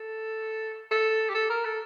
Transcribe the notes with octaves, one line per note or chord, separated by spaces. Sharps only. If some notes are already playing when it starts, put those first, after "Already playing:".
Already playing: A4
A4
G4
A4
A#4
A4